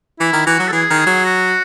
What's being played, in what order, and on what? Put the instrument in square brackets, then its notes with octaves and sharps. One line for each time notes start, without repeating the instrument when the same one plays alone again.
[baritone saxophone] E3 [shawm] E4
[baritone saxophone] D#3
[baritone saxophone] E3 [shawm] F#4
[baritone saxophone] F#3
[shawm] A4
[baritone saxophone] E3 [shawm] G#4
[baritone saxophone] D#3
[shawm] G#4
[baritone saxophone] F#3
[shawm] F#4